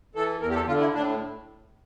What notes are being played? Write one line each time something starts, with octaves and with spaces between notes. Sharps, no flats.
E3 A4
E2 A#4
G4
A4
D3 F4
E4
A2 D4